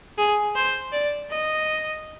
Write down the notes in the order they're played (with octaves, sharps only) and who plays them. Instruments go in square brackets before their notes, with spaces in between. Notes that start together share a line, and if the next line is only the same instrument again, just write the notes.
[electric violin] G#4
C5
D5
D#5